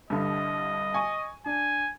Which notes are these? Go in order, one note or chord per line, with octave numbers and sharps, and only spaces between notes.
C2 G2 D3 D#5
G#5 C#6
D4 G#5